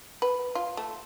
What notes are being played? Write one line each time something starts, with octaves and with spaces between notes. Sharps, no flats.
B4
F4
A3